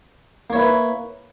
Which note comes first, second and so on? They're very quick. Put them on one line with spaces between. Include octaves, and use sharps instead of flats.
A#3 C#5 E4 B4